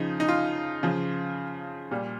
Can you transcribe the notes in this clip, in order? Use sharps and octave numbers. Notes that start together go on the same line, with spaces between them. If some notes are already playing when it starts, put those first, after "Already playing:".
Already playing: C#3 F3 D#4
D#4
F4
C#3 F3
A#2 G3